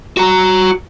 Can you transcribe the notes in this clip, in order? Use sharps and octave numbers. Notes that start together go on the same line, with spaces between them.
F#4 A#5